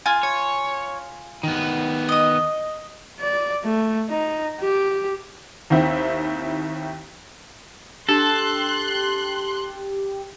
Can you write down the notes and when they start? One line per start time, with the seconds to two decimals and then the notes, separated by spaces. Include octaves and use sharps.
0.06 F4 G#5
0.23 C#5
1.43 D#3 B3
2.09 D#5 D#6
3.20 D5
3.65 A3
4.10 D#4
4.60 G4
5.70 D#2 D#3 C4 E4
8.09 D4 G4 A4 A5 C6 F#6